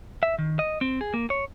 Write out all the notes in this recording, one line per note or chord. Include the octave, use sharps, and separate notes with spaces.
E5
D#3
D#5
C4
G#4
A#3
C#5